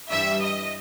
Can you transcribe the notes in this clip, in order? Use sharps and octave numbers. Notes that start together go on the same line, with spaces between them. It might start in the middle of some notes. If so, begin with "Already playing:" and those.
G2 E3 G3 E5
D#5